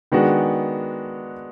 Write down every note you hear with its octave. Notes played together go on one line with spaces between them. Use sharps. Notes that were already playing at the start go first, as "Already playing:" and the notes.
D#3 G#3 B3 D4 F#4